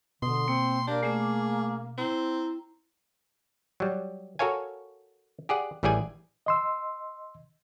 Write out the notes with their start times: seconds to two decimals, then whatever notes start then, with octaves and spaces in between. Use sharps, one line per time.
0.22 B2 D3 C6 D#6
0.48 A#3 C4
0.87 A#3 D4 G4 A#4 D5
1.03 A3 C#4 G#4 D6
1.98 C4 E4 A#5
3.80 F#3 G3
4.39 F#4 A4 A#4 C#5 F5 G#5
5.49 G4 G#4 D5 F#5
5.83 A1 E3 G3 G#4 D5 G#5
6.46 D#5 C6 E6